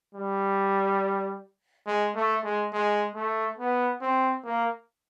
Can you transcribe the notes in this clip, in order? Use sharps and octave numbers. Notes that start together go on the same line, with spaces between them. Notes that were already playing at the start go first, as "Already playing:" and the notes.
G3
G#3
A3
G#3
G#3
A3
B3
C4
A#3